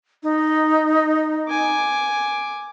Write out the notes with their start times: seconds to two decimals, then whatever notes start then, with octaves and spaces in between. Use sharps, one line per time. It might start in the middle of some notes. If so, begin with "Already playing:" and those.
0.23 D#4
1.49 G#5 D6